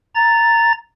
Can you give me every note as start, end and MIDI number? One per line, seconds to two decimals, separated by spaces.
0.15 0.72 82
0.15 0.72 93